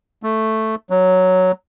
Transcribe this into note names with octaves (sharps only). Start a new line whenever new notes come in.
A3
F#3